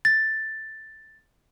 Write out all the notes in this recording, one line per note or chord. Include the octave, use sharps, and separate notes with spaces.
A6